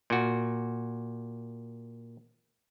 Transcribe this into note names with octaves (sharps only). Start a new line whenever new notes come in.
A#2 F#4